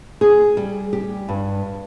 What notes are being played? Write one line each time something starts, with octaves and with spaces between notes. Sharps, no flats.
G#4
G3
G4
G2